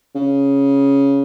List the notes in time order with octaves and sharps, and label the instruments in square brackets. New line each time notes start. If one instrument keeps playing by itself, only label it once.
[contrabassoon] C#3